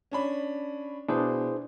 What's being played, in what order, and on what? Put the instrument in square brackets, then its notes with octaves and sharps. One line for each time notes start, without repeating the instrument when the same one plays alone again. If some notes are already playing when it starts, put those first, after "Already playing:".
[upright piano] C#4 D4 B5
[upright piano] B2 [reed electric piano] D4 [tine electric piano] E4 G#4 C5